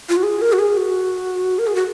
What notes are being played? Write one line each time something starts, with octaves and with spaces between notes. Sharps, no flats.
F4
F#4
G#4
A#4
F#4
G#4
F#4
A#4
G#4
F#4